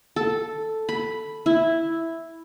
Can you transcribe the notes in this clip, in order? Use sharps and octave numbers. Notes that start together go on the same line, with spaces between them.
A4
B5
E4